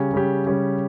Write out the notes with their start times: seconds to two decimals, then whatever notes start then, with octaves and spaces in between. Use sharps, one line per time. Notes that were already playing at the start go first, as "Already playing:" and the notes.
Already playing: C#3 G3 C#4 G4
0.14 C#3 G3 C#4 G4
0.47 C#3 G3 C#4 G4